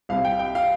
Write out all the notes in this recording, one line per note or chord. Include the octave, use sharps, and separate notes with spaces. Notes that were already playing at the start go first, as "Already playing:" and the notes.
C2 C3 G3 F5
G5
G5
F5